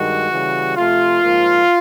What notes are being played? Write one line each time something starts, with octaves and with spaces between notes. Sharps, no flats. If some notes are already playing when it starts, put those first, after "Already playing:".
Already playing: G2 D#3 G#3 F#4
C#3 E3 G3
C3 F3 A3 F4
G#2 F3 A#3